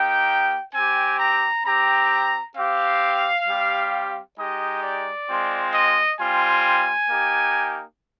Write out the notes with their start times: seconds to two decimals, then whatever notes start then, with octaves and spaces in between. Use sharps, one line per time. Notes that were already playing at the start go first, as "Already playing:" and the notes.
Already playing: A#3 D#4 G4 G5
0.74 C4 G4 G#5
1.19 A#5
1.65 C4 G4 A#5
2.56 C4 G4 F5
3.47 G3 C4 G4
4.38 G#3 D#4 G4 D#5
4.83 D5
5.29 G#3 C4 F4
5.74 D#5
6.19 G3 C4 F4 G#5
7.10 A#3 D#4 G4